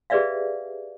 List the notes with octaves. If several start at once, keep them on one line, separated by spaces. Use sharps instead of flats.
G4 G#4 B4 D5 E5 F5